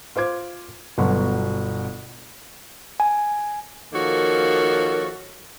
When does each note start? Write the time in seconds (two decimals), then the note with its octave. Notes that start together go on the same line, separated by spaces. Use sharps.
0.16 F4 C5 D6 G#6
0.98 G1 B2 F#3 F#5 C6
3.00 G#5
3.93 D#3 F3 A#3 F#4 A4 C#5